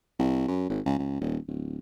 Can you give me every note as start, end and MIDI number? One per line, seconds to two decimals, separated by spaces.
0.19 0.43 36
0.48 0.66 42
0.70 0.80 32
0.86 0.95 37
0.99 1.20 37
1.21 1.37 27
1.48 1.78 26